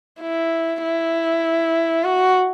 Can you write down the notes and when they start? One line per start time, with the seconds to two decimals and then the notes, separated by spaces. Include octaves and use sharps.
0.22 E4
0.83 E4
2.04 F#4